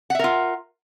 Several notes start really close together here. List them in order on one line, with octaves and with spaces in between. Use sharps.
F#5 E5 A#4 F4